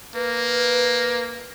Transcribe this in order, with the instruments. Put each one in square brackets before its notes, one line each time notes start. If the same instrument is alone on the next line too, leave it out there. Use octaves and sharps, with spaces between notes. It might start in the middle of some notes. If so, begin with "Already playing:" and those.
[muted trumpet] A#3 [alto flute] B4